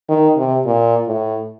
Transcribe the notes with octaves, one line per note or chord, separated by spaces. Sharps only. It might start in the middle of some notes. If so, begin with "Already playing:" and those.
D#3
C3
A#2
A2